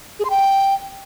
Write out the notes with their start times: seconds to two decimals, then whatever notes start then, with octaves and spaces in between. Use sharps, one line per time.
0.19 G#4
0.25 C6
0.30 G5